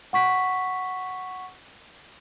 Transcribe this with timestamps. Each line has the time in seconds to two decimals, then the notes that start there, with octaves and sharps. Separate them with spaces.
0.13 F#5 C#6 B6